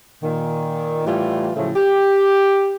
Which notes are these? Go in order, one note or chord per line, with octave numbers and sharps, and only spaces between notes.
A#2 D#3
A2 E3 G3 A3 F4
A2 C#3 F3 F#3 A3
G4